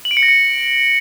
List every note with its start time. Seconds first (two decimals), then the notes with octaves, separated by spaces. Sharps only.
0.05 F#7
0.11 D7
0.17 C#7
0.23 A#6
0.28 C#7